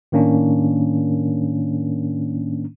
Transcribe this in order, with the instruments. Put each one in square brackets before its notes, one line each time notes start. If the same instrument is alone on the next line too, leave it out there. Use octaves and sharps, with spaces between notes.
[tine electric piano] A2 D#3 A#3 C#4 D4